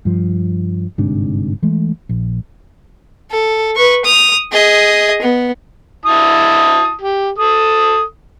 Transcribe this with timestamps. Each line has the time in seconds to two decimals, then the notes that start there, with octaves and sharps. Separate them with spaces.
0.05 G2 F3
0.98 G1 G#2 C3 D4
1.62 E3 G#3 A3
2.09 A#1
3.30 A4
3.76 B4 C#6
4.05 D#6 F7
4.52 G#4 D#5
5.22 B3
6.06 E4 A5 D#6
7.02 G4
7.39 A4 D#6